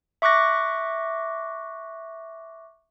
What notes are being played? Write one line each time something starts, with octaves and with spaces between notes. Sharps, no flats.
E5 C#6 D6 F#6 A#6